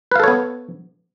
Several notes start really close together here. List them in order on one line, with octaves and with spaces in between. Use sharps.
B4 F5 A4 C#5 B3